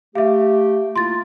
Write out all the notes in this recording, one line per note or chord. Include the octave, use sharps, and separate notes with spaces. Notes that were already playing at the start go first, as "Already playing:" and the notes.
A3 G4 E5 F5
A#3 E4 F4 C6 A6